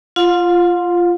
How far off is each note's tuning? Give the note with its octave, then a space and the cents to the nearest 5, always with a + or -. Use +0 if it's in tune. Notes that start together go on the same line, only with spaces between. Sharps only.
F4 -15 F5 +40 C6 +0